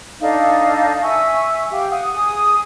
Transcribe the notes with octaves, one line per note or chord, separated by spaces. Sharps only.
D4 D#4 A4 F5
E5 G#5 C#6 E6
G4 F5
F#5 D#6
G#4 D#6